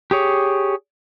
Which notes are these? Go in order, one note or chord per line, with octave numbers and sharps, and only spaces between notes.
G4 G#4 C#5